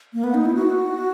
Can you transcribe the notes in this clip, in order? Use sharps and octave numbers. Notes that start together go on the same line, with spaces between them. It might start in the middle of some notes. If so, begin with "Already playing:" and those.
A#3
B3
D#4
E4
F#4